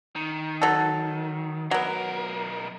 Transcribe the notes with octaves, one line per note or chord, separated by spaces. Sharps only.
D#3
F#3 A4
B1 F#3 B3 A#4